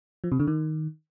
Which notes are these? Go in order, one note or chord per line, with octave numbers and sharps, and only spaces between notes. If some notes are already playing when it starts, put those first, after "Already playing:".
F3
C3
D3
D#3